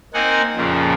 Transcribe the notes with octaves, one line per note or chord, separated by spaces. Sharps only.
A#3 C4 D#4 F#5 G#5
F2 A#2 C#3 F3